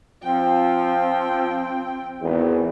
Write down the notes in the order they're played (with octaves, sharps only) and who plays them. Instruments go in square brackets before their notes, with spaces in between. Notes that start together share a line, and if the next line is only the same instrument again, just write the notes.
[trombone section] F3 [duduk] C4 [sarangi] G5
[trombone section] G#1 [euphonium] E2